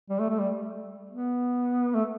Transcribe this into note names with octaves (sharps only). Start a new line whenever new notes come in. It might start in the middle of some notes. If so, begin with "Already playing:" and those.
G3
A3
A3
G3
B3
A3